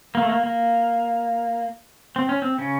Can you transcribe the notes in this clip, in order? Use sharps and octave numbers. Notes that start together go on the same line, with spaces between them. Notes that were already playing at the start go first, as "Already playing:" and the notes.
A#3
A3
A#3
A#3
C4
C#4
C4
C#3 C#4